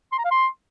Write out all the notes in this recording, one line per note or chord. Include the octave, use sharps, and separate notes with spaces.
C6
A#5
F5
C6